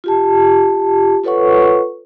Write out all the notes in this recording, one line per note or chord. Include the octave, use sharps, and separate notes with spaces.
F4 G4 A5
F4 A4 B4 C#5 F#5 C#6